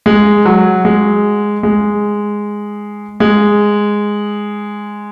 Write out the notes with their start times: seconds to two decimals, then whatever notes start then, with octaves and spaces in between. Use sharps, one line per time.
0.06 G#3
0.46 F#3
0.85 G#3
1.63 G#3
3.20 G#3